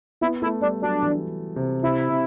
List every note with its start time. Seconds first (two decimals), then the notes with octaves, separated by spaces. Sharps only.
0.21 B3 E4
0.42 A3 E4
0.61 G3 D4
0.82 F#3 D4
1.02 E3
1.56 C3
1.83 C3 E4
2.09 C3